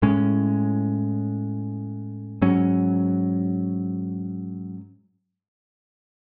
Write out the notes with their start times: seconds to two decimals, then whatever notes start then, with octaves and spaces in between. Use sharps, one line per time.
0.02 A2 G#3 C#4
2.42 G#2 F#3 C#4